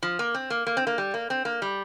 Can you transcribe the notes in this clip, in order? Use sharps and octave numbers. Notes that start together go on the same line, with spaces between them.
F3
A#3
C4
A#3
A#3
C4
A#3
G3
A#3
C4
A#3
G3